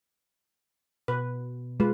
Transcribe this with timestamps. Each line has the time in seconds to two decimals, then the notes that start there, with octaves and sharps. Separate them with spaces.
1.08 B2 B4
1.80 G#3 F4 B4